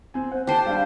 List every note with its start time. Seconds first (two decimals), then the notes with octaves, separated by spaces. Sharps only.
0.14 C4 G#5
0.31 C5 F#5
0.47 G4 C5 A5
0.66 G3 D4 F5